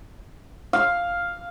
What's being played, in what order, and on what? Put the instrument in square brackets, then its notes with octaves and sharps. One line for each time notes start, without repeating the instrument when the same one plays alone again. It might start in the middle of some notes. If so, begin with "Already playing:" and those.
[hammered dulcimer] F5